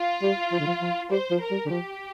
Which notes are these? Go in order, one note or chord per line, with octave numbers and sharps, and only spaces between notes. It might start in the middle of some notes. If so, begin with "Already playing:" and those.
Already playing: F4
G3
F3
D3
F3
F3
G3 C5
F3
A#4
G3
D3
F3 G4